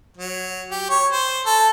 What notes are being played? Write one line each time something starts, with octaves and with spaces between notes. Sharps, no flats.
F#3
G4
C#5
C5
A4